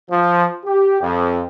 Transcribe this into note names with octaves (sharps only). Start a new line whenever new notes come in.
F3
G4
F2